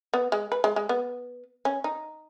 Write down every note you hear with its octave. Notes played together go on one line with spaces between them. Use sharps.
B3
G#3
B4
G#3
G#3
B3
C#4
D#4